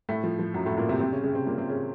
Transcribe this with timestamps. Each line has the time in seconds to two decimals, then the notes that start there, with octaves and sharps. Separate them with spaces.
0.09 A2 A3
0.24 F3
0.39 F3
0.54 F#2 F#3
0.66 A2 A3
0.77 A#2 A#3
0.89 C3 C4
1.00 C3 C4
1.12 C#3 C#4
1.24 C#3 C#4
1.35 C3 C4
1.46 A#2 A#3
1.58 C3 C4
1.69 C#3 C#4